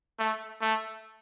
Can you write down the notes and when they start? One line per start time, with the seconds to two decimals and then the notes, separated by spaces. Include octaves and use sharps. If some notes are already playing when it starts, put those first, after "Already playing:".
0.19 A3
0.61 A3